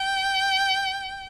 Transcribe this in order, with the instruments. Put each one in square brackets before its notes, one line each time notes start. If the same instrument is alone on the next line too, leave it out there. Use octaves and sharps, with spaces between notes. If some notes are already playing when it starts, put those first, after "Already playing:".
Already playing: [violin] G5